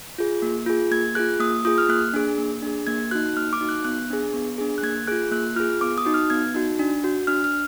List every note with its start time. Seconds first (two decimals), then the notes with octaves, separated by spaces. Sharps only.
0.18 F4 G#4
0.42 A#3
0.66 F4 G#4
0.91 A#3 G#6
1.15 F4 G#4 F#6
1.40 A#3 D#6
1.65 F4 G#4 D#6
1.78 F6
1.89 A#3 F#6
2.13 D4 G#4
2.38 A#3
2.62 D4 G#4
2.87 A#3 G#6
3.11 D#4 F#4 F#6
3.36 A#3 F6
3.53 D6
3.61 D#4 F#4
3.69 F#6
3.85 B3 F#6
4.10 D4 G#4
4.34 B3
4.58 D4 G#4
4.78 F#6
4.83 A#3 G#6
5.07 F4 G#4 F#6
5.31 A#3 F#6
5.56 F4 F6
5.60 G#4
5.81 B3 D6
5.98 D#6
6.05 D#4 F#4
6.14 F6
6.30 B3 G#6
6.55 D#4 F#4
6.79 D4
7.04 F#4
7.27 D4 F6
7.44 F6